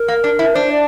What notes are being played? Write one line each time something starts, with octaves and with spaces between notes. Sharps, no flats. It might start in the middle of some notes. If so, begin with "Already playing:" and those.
Already playing: A#4
A#3
D4
E4
D4 C5
D5